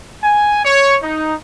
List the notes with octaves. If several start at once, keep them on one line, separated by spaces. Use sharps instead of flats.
G#5
C#5
D#4